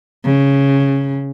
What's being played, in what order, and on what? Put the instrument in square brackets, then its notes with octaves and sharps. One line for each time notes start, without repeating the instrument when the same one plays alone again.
[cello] C#3